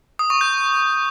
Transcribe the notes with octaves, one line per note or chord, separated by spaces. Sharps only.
D#6
C#6
G6